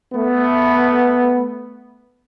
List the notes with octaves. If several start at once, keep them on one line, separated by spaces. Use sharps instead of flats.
A3 B3